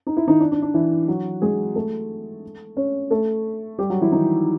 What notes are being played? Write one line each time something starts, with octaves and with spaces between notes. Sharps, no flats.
D#4
E4
D#3 D#4
D4
D4
D4
E3 E4
F#3 F#4
G#3 G#4
A3 A4
C#4 C#5
A3 A4
G3 G4
F#3 F#4
E3 E4
D#3 D#4